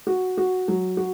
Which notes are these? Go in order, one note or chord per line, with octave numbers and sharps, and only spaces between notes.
F#4
F#4
F#3
F#4